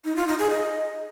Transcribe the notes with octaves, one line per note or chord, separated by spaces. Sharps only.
D#4
F4
D#4
G#4
D#5